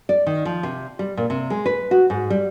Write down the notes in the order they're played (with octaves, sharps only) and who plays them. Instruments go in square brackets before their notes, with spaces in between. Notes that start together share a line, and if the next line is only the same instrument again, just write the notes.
[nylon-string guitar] D5
D#3
F3
C3
G3
A#2
C3
G#3
B4
F#4
G#2
G3